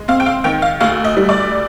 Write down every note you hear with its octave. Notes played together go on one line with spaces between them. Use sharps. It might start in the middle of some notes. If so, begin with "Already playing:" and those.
Already playing: G#3
C4 F5
G5
F5
D#3 G5
F5
D2 F5
D#5
G3
D5